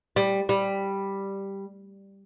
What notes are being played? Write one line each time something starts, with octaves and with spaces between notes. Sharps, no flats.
G3
G3